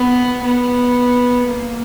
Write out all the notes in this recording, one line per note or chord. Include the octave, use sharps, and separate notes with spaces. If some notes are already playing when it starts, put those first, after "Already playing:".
Already playing: B3
B3
A#3